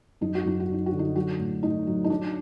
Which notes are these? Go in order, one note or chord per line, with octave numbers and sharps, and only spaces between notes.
F#2 D#4
F#4
F#2 D#4
F#4
F#3 D#4
F#4
D3
D#4
F#3 F#4
A2
A2 D#4
F#3
D#4
F#3 D4